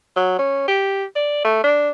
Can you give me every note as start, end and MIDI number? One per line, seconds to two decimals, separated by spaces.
0.16 0.35 54
0.39 0.64 61
0.68 1.04 67
1.16 1.42 74
1.45 1.62 57
1.64 1.90 62